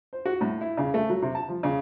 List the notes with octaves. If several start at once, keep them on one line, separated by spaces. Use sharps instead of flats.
C5
F#4
A2
E4
C#3
A3
F#3
C3
A5
F3
C#3